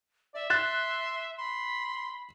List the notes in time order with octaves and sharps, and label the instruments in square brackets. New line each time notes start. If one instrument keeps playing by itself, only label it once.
[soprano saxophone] D5 [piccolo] E5
[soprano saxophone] C6 [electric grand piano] F#6 A6 E7
[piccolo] B5 [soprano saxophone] C6